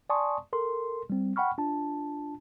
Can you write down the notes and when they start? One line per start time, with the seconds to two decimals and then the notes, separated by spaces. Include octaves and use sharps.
0.10 D5 G#5 A5 C6 C#6 D#6
0.53 A4 A#4 C6
1.10 G3 C4
1.36 F#5 G5 B5 C#6 F6
1.58 D4 F4 A5